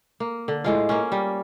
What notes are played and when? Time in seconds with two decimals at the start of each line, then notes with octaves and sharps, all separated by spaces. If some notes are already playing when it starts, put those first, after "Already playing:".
0.20 A#3
0.48 D3
0.64 A2 G#3 F4
0.89 A#3 C#4
1.12 G3